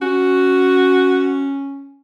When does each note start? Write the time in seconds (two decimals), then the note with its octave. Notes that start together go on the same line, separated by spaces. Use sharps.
0.02 C#4 F#4